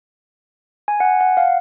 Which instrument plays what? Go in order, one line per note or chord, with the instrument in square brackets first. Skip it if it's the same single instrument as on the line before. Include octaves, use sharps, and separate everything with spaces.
[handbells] G#5
F#5
G#5
F#5
F5